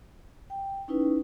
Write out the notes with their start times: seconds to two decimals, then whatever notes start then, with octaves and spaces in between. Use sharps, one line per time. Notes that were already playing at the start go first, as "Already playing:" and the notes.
0.50 G5
0.88 C#4 D#4 E4 B4